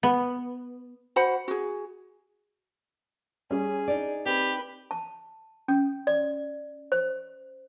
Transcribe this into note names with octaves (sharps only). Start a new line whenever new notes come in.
B3
F#4 C5 F#5 B5
F#4 G#4
G3 C#4 G#4
D4 D#4 D5
C4 G4 B4
A5
C#4
D5
C5